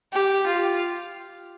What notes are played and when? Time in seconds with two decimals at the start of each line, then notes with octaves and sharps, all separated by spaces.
0.13 G4
0.47 F4